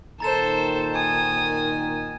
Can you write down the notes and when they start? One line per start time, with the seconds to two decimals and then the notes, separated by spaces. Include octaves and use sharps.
0.20 A#2 D#3 A4 C5 A#5 A6 E7
0.95 G#5 D#6